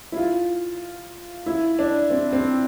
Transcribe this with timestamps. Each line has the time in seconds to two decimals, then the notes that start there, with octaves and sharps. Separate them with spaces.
0.12 E4
0.17 F4
1.46 E4
1.79 D4
2.10 C4
2.33 C4